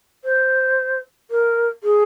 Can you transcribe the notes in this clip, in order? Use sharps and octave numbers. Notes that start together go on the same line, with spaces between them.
C5
A#4
G#4